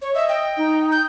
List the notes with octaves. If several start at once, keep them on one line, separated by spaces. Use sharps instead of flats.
C#5
D#5 E5
G5
D#4
G6